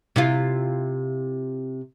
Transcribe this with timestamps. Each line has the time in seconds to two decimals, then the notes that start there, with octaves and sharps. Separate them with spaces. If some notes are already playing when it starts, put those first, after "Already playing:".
0.16 C3 E4 F4